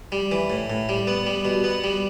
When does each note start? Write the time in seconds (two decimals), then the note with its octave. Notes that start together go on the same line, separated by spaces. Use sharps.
0.12 G3
0.32 E3
0.50 A2
0.70 A2
0.89 G3
1.07 B3
1.26 G3
1.45 B2
1.64 B3
1.84 G3